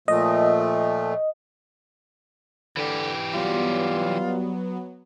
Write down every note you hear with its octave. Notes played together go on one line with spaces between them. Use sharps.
A#2 F3 A3 D#5
D3 E3 G4
F#3 G3 B3 F4